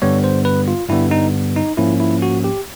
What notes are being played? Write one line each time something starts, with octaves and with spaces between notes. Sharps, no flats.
G2 D3 G3 B3 C#5
C5
B4
F4
G2 D3 G3 B3 E4
D#4
D#4
G#2 F3 A#3 C#4 E4
E4
F#4
G4